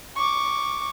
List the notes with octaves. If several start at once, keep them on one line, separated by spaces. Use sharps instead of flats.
C#6 D6